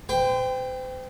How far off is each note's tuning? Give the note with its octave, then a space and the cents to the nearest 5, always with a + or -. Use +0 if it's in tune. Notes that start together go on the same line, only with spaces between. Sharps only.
C5 -40 G5 +10